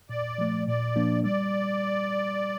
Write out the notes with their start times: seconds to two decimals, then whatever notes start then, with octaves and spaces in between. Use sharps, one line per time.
0.09 A#2 D5
0.38 F3 A3
0.67 A#2 D5
0.96 F3 A#3 D4
1.24 G3 D5